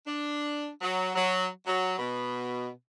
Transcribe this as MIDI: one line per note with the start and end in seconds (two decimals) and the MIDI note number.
0.05 0.68 62
0.81 1.11 54
1.14 1.47 54
1.66 1.95 54
1.98 2.69 47